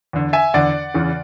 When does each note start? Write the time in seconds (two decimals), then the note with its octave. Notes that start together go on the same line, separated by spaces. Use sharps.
0.13 E2 D3
0.33 E5 G#5
0.54 E2 D3 D5 F#5
0.94 E2 C#3 E3